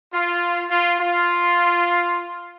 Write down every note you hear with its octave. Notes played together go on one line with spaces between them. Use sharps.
F4
F4
F4